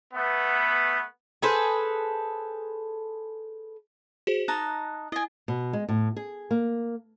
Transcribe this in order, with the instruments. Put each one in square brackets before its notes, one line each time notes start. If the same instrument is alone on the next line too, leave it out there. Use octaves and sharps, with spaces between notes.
[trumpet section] A3 B3
[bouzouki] G#4 A4 B4 C5
[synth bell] F#4 G#4 C5
[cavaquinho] D#4 A5 A#5 [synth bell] F#6
[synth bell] E4 [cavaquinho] D#5 G#5
[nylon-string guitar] B2
G#3
A2
G#4
A#3